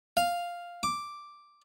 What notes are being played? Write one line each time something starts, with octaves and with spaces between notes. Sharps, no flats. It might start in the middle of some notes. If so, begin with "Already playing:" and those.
F5
D6